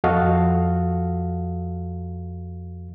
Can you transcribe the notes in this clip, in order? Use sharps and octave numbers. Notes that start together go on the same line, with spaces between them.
F2 F3 F#4 A4 D#5 F5